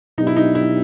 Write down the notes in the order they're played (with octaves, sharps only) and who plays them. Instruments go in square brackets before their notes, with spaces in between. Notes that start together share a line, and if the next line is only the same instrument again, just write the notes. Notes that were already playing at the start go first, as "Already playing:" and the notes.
[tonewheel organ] B2 F#3 B3 D4 G4 [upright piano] D#4
[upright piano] E4
D#4
E4